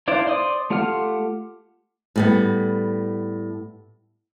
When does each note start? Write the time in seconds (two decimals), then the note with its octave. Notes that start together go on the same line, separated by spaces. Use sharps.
0.08 D4 E4 C5 D5 F5
0.26 C5 D5 C6 D6 D#6
0.70 A3 F4 G4 F#5 F6
2.16 A2 G3 B3